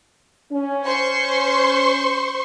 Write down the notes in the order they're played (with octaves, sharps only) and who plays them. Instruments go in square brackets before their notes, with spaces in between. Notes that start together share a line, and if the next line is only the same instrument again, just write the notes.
[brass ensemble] C#4
[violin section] C5 C6 C#6